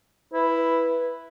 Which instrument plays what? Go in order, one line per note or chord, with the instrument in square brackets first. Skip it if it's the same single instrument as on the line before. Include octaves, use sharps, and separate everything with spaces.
[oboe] E4 [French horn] B4